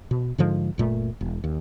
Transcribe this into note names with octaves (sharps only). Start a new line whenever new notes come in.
B2
G#2 D3 F3 G#3
F#1 A#2 A3
E1
D#2